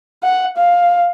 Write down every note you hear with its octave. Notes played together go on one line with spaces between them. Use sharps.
F#5
F5